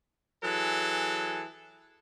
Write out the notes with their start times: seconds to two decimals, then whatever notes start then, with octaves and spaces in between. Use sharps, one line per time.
0.43 E3 F#3 G#4 A4